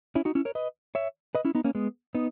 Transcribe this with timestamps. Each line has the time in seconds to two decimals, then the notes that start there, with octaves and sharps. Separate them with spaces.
0.15 C#4 E4
0.25 D#4 F#4
0.35 C#4 E4
0.45 A#4 C#5
0.55 B4 D#5
0.95 C#5 E5
1.35 B4 D#5
1.45 C#4 E4
1.55 B3 D#4
1.64 A#3 C#4
1.75 G#3 B3
2.15 B3 D#4